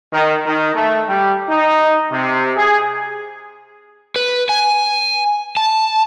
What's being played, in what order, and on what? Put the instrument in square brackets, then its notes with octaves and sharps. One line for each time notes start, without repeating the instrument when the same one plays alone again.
[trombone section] D#3
D#3
A3
G3
D#4
C3
G#4
[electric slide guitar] B4
G#5
A5